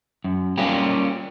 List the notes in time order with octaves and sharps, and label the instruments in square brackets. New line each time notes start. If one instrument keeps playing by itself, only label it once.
[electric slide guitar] F#2
G3 A#3 C#4 F4 G4